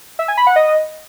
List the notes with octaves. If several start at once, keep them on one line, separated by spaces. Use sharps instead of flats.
E5
G#5
B5
F#5
D#5